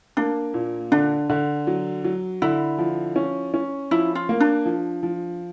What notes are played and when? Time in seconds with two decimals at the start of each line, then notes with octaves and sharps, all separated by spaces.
0.17 A#3 D4
0.54 A#2
0.92 D3 D4
1.30 D3
1.67 F#3
2.04 F#3
2.42 D3 E4
2.78 F3
3.16 C#4
3.54 C#4
3.91 F3 E4
4.15 F4
4.29 A#3
4.40 D4
4.65 F3
5.03 F3